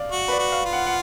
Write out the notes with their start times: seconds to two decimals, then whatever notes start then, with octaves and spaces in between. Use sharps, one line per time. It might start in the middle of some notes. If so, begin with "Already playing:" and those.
Already playing: D5 F5
0.11 F#4
0.28 B4
0.32 D5
0.39 F#4
0.52 F5
0.65 F4
0.73 F#5
0.86 F#5